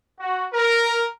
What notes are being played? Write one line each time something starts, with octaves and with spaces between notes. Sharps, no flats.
F#4
A#4